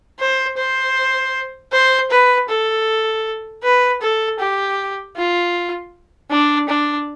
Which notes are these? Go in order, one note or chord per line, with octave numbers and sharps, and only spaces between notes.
C5
C5
C5
B4
A4
B4
A4
G4
F4
D4
D4